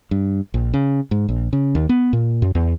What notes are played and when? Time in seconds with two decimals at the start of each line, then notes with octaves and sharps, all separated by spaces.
0.11 G2
0.54 A#1
0.74 C#3
1.11 G#2
1.29 A#1
1.53 C#3
1.75 D#2
1.89 B3
2.13 A#2
2.42 F#2
2.55 E2